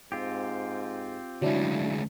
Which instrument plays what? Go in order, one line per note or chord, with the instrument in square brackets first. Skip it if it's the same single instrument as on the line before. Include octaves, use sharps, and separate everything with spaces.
[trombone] G#2 [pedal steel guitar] C4 F4 G4
[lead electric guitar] D2 G#3 [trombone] C#3 [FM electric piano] F#3 D4 E4